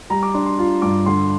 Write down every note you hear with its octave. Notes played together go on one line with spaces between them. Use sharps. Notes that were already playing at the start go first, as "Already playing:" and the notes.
G3 A#5
D6
D4 C6
C6
F4
G2 D6
D3 C6